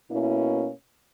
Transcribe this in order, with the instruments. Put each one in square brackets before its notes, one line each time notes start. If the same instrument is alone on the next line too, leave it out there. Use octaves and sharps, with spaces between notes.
[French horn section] B2 A#3 C#4 E4